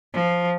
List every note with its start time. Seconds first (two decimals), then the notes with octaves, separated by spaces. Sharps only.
0.14 F3